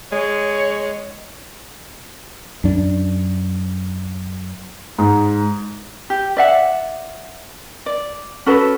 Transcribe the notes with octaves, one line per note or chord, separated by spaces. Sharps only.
G#3 C#5
F#2 D4
G#2
G4
D5 E5 F#5
D5
C#4 F#4 A4 B4